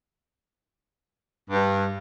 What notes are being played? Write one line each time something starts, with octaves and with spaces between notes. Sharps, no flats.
G2